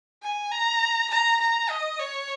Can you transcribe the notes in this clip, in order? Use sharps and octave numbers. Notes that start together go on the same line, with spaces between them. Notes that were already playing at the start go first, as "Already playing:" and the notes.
G#5
A#5
A#5
A#5
D#5
C#5